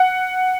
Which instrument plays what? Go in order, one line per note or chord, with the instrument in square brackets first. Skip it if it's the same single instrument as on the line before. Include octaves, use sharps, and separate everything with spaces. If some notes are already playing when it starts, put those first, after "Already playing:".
Already playing: [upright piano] F#5